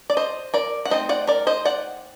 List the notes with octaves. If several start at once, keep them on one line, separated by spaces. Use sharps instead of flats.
D5
C5 D#5
A#4 D5
F#5
A3 C4 D#4 C5 D#5
D5 F#5
A#4 D5
C5 D#5
D5 F#5